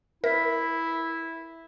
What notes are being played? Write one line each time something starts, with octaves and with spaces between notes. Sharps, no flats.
E4 A#4 E5 B6